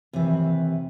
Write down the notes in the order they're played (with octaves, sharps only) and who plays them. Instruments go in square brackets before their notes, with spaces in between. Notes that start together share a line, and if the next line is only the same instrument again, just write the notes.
[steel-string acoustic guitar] D#2 C3 E3